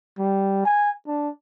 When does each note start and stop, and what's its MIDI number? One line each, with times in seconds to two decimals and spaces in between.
0.19 0.61 55
0.65 0.91 80
1.07 1.29 62